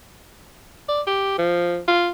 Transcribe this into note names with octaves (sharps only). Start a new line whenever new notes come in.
D5
G4
F3
F4